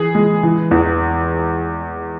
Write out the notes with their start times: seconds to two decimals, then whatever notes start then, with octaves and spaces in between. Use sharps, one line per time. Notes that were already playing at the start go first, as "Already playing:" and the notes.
Already playing: E3 G#4
0.15 G#3
0.43 E3
0.71 E2